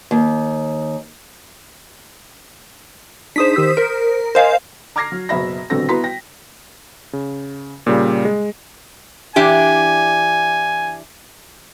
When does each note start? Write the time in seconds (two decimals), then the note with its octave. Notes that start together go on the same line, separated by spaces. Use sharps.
0.11 D#2
3.36 D4 D#4 G#4 C5 D#6 B6
3.56 D#3 G4 E6
3.77 A#4 C5
4.35 A#4 C5 D#5 F5 G#5
4.96 A#5 D6 F6 G#6 A#6 C7
5.12 F#3
5.29 F#1 B2 E5 B5 A#6
5.70 D#1 B2 D3 C4 A4 A#6
5.89 B3 E4 F#4 A#5 C6 B6
6.04 G5 A#6
7.13 C#3
7.87 A#2 C#3 G3
8.25 G#3
9.36 E3 D4 G4 G#5